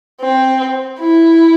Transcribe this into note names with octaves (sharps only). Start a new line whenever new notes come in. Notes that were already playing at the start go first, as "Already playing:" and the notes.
C4
E4